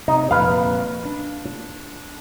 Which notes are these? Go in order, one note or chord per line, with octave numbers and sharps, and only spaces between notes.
C3 D#4
F2 A#2 B4 F5
D4